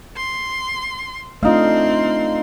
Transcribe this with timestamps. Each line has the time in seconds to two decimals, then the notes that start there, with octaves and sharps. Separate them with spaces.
0.17 C6
1.43 A3 C4 D4 D#4 F4 F5 C6